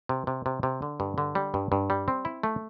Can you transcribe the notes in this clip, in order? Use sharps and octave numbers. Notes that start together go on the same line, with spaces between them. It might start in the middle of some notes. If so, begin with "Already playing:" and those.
C3
C3
C3
C3
D3
G2
D3
G3
G2
G2
G3
C4
E4
A3